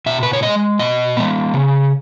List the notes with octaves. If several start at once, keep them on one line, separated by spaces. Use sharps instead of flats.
B2 E5
B4
C#5
G#3 B3 D#5
B2 D#5
G#3 B3
C#3